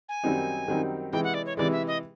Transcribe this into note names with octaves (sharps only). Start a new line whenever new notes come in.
G#5
F#2 D#3 G3 C4 D#4
F#2 D#3 G3 C4 D#4
C3 E3 G#3 G5
F#5
D5
C#5
C3 E3 G#3 D5
E5
D#5